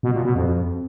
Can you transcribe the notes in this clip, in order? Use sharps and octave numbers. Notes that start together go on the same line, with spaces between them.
B2
A#2
B2
F2